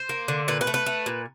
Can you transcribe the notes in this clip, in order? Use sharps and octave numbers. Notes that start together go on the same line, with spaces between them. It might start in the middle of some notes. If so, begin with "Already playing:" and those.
Already playing: C5
A#3
D3
A#2 B4
B4
A3
B4
A3
A#2